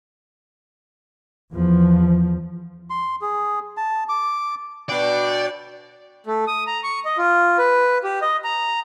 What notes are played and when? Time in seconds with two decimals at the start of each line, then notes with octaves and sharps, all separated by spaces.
1.53 E2 F3
2.90 C6
3.21 G#4
3.77 A5
4.09 D6
4.89 B2 D4 D5 G5
6.26 A3
6.47 D#6
6.67 A#5
6.83 C#6
7.05 D#5
7.18 F4
7.58 B4
8.04 G4
8.22 D#5
8.44 A#5